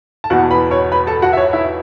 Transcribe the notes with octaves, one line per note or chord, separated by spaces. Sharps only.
A5
E2 B2 B3 F#4 F#5
B4 B5
C#5 C#6
B4 B5
A4 A5
F#4 F#5
E5
C#5
E4 E5